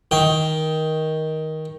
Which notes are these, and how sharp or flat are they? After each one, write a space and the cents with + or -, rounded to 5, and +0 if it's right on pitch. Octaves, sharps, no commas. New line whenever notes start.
D#3 +15 G5 +0